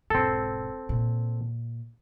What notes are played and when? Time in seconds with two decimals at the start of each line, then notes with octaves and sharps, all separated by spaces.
0.10 E1 G#2 C4 A4
0.89 A#2